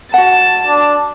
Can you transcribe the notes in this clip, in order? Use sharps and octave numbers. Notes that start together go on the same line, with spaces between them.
F#4 F#5 A5
D4